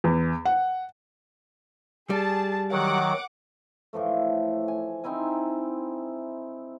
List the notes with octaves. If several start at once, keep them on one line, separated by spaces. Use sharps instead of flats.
E2
F#5
G3 G#4 A5
D#3 F#3 F#5 D6
A2 E3 F3 A3
G#5
C4 D#4 E4 G#5